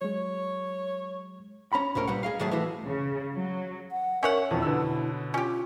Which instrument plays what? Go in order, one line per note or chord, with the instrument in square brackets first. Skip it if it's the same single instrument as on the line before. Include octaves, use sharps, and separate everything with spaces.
[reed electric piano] F#3 G#3 [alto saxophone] C#5
[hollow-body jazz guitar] C#4 A#5 B5
C2 A2 C#4 A#4
A#2 G3 B4 F#5
G#4 D#5 F5
A2 D#3 F#3 G#4 E5 A5
E3 A3 E4 F#4
[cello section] C#3
F#3
[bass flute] F#5
[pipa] C#4 C#5 F#5 [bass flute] A#4 [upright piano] E5
[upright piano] E1 F2 F3 [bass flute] E4
[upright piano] B2 D3 E6
[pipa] C#4 G4 [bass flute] F4